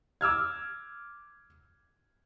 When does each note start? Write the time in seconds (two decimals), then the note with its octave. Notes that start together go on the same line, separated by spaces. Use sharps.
0.21 D6 E6 F6 G#6